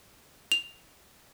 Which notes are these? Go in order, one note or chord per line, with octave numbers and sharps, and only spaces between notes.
F7